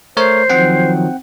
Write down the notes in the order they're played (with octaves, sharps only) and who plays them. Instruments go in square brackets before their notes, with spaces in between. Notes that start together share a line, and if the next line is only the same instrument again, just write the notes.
[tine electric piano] A3 A#4 C#5 [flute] C5
[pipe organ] D#3 F3 F#3 [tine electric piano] C4 F#5 G5